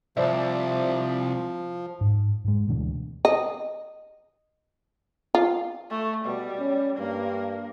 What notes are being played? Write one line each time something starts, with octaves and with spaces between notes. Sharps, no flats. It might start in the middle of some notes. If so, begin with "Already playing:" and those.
C2 F3 C5 D5 E5
G#2
G#2 G#3
D2 B2 E3 D4
D#5
F4
A3
B2 G3
C#4
G2 A#3